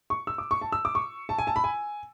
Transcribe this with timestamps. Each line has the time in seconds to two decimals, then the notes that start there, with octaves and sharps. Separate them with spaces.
0.10 C#6
0.27 E6
0.38 D6
0.51 C#6
0.61 A5
0.72 E6
0.85 D6
0.95 C#6
1.29 A5
1.38 G#5
1.47 A5
1.56 B5
1.64 G#5